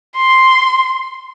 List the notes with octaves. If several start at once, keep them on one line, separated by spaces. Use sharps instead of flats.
C6